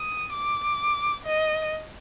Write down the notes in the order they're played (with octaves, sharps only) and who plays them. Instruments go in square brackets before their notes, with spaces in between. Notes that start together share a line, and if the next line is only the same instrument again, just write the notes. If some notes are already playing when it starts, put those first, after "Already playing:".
Already playing: [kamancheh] D#6
D6
D#5